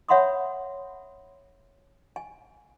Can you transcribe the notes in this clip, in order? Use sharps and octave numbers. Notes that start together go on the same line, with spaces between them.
C#5 E5 F#5 B5 C6 D#6
G#5